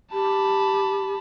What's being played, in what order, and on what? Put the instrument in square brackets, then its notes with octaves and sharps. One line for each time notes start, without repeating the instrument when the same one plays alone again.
[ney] G4 [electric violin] A5 B5